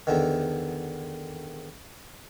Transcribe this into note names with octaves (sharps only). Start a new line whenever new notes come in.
E2 D3 D#3